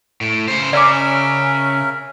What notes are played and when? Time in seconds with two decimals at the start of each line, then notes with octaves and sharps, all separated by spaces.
0.21 A2
0.48 C#3 C5
0.73 C#3 C#4 A#4 D5 E5 D6